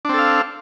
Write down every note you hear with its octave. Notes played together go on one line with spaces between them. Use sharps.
C4 D4 A4 F5